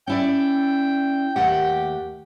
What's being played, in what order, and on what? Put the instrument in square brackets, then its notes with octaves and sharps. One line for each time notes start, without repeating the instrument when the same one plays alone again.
[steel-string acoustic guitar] C#4 E4 D5 [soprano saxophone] G5
[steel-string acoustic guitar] D#2 A3 F#5 [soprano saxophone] G4